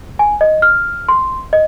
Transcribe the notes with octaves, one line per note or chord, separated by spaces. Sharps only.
G#5
D#5
F6
C6
D#5